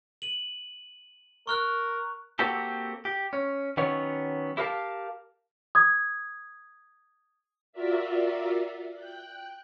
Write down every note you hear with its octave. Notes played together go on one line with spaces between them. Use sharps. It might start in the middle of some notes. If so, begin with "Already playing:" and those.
D#7 F#7
A#4 C#6 F6 F#6
A#3 C4 F#4 G4 A4
G4
C#4
D#3 F#3 B3 C#4 C#5
E4 G4 A#4 D#5 F5 A5
D#6 G#6
F4 F#4 A#4 D5 E5
G5 F#6